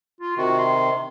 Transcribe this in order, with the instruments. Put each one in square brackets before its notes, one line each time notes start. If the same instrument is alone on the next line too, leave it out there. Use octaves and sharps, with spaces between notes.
[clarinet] F4
[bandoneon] C3 D#3 [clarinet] F#4
[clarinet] C6